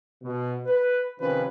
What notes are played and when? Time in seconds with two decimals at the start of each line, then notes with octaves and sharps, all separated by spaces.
0.23 B2
0.66 B4
1.19 C3 D#3 F3 C#4 B4